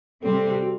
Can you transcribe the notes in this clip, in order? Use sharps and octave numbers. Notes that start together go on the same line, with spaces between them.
C3 G3 C4 A4
A4
G4
F#4